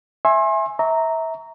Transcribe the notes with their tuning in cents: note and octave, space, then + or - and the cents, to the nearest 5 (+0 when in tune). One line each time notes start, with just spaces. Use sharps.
E5 +0 G#5 +0 C6 +35
E5 -25 A#5 -10 C#6 +20